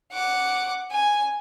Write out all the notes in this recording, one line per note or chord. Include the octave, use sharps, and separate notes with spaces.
F#5 D6
G#5